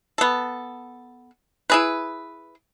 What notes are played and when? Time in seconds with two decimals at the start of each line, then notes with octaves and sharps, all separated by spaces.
0.18 B3 A4
1.70 E4 G#4 B4